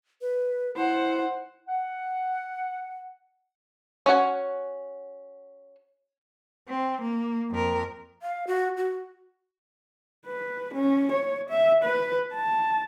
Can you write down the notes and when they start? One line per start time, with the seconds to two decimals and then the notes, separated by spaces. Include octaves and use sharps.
0.21 B4
0.76 E4 C5 F#5
1.68 F#5
4.06 C#4 F#4 F#5 G#5
6.69 C4
7.02 A#3
7.51 F2 A#4
8.22 F5
8.47 F#4
8.77 F#4
10.27 B4
10.74 C#4
11.12 C#5
11.50 E5
11.84 B4
12.34 A5